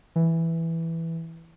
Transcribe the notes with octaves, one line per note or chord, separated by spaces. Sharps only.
E3